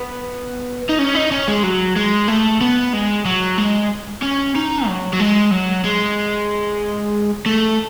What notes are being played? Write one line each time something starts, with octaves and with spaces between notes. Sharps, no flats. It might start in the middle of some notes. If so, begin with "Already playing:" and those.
Already playing: B3
D#4
C#4
D#4
C#4
G#3
F#3
G#3
A3
B3
G#3
F#3
G#3
C#4
D#4
F#3
F#3
G#3
F#3
G#3
A3